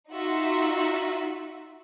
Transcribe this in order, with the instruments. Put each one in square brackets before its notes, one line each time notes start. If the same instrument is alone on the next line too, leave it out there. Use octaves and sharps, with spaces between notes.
[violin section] D#4 F4 F#4 E5